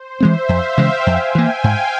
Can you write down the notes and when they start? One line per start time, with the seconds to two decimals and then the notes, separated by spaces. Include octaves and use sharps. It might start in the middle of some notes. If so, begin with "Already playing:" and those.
Already playing: C5
0.20 E3 G#3 C4 E5
0.49 F2 F5
0.77 C#3 E3 G#3 G5
1.07 F2 G#5
1.35 E3 A#3 G5
1.64 G#2 F5